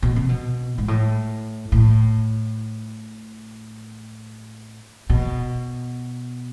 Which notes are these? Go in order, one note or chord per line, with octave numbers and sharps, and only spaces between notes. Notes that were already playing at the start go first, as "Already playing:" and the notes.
B2
C3
B2
G#2
A2
A2
B2